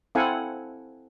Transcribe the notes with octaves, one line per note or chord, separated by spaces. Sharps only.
C4 E4 A4 F5 F#5 G#5